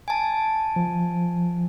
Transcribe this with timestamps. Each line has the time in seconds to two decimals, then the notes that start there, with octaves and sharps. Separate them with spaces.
0.08 G#5 A5
0.76 F3